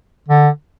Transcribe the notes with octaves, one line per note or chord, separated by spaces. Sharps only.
D3